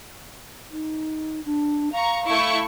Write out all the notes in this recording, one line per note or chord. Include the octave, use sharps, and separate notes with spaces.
D#4
D4
F5 A#5 C#6
A3 E4 C#6